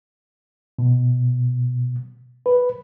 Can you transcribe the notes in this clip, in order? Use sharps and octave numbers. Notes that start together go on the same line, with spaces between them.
B2
B4